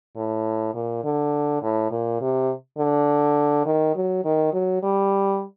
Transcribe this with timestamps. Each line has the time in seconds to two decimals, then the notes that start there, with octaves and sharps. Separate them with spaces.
0.16 A2
0.74 A#2
1.04 D3
1.62 A2
1.92 A#2
2.21 C3
2.78 D3
3.66 D#3
3.95 F#3
4.25 D#3
4.53 F#3
4.83 G3